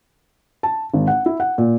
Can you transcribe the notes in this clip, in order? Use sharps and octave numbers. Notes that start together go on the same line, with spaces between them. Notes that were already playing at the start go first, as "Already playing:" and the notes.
A5
G#1
F#5
E4
F#5
A#2